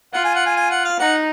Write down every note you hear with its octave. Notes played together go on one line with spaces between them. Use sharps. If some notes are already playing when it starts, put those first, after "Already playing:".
F4 F#5
G#5
F#5
G#5
G#5
F#5
F5
D#4 F#5